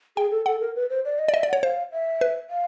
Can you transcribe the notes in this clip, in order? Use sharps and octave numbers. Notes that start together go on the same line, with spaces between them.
G#4 G5
A4
A4 F#5
A#4
B4
C5
D5
D#5
D5
D#5 E5
D5
C#5 F#5
C5 F5
E5
B4
F5